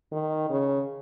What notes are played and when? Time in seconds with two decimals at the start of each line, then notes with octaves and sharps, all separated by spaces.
0.12 D#3
0.50 C#3